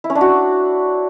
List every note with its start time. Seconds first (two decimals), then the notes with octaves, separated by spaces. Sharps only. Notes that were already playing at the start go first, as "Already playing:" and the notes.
0.04 E4
0.10 C#4
0.15 D4
0.21 F#4